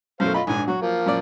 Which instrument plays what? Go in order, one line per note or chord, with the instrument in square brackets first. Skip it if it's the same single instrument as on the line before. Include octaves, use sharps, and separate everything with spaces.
[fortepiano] F#2 B2 A3 [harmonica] C5 F5
[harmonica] F4 D#5 [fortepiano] B5
[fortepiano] A#1 G#2 D4 [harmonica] G#5
[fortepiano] F#3 [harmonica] F#4
[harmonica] F3 A#3
[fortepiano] F#2 A#2 D5